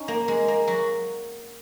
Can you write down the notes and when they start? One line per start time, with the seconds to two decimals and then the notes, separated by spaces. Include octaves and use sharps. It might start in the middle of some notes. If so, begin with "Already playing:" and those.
Already playing: C#4 D#4
0.08 A#3
0.28 G#3
0.48 A#3
0.67 F#3 F#4